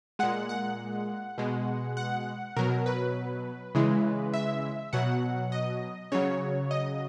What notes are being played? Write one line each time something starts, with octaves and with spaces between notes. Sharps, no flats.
A#2 G#3 F#5
F#5
B2 G#3
F#5
B2 F#3 A#4
B4
C#3 E3 G#3
E5
B2 F#3 F#5
D#5
C#3 F#3 C#5
D#5